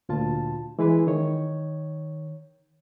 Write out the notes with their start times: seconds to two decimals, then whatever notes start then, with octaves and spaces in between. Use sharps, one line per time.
0.09 D2 A#2 F4 A5
0.79 E3 G#3 E4 G#4 B4
1.07 D#3 C#5